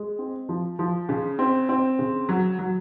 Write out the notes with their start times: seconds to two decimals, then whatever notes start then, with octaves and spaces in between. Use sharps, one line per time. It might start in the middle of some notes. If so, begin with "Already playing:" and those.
Already playing: G#3
0.19 C4
0.49 F3
0.79 F3
1.09 C#3
1.39 C4
1.69 C4
1.99 C#3
2.29 F#3
2.59 F#3